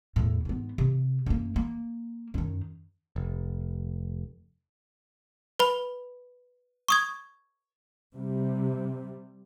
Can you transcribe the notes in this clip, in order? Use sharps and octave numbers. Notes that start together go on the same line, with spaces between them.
E2 A2
G#2 B3
C3
F#2 A#3
A#3
F#2 D#3
F1
B4 B5
C#6 D#6 G#6
C3 G3